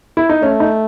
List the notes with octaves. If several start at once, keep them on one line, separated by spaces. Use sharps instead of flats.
E4
D#4
A3 C#4
D#4